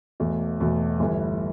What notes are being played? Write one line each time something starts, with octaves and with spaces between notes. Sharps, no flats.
E1 E2 B2 A3
E1 E2 B2 A3
G1 G2 E3 A3